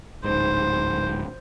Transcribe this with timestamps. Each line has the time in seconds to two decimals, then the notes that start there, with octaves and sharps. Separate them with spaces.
0.24 D1 G#2 D#4 C5 B5